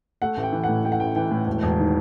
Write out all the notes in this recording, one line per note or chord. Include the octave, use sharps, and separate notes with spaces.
A3 F#5
A1
G5
E3
A2 F#5
A3 G5
F#5
A1 G5
E3 G5
A2
E1
E1
D#3